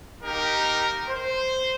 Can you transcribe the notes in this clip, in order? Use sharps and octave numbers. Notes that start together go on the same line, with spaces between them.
A#3 D#4 G4 A#4
C5